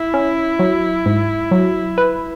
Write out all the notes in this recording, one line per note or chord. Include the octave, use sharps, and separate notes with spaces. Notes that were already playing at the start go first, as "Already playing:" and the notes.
Already playing: E4
C#4
F#3
G#2
F#3
B4